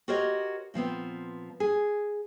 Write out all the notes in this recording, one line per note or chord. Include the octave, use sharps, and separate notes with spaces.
F#4 G4 A#4 C5 C#5 D#5
A#2 F3 B3 C4
G#4